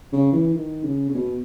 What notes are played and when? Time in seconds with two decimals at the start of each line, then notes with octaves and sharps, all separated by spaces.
0.13 C#3
0.32 E3
0.54 D#3
0.84 C#3
1.09 C#3
1.14 B2